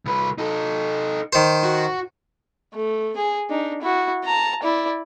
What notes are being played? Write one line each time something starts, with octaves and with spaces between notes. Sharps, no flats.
C2 B4
D#4 A4
D#3 C5
F#4
A3
G#4
D4 D#4
E4 F#4
A5 A#5
E4 D5